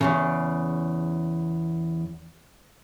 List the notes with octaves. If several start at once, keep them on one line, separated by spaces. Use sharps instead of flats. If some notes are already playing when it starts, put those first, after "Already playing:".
E2 A#2 C#3